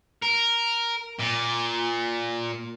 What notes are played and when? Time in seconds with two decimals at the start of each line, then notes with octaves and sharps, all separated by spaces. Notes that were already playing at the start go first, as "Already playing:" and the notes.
0.22 A#4
1.19 A#2